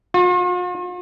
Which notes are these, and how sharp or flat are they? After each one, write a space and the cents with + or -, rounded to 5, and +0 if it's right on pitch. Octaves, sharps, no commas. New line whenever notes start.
F4 +45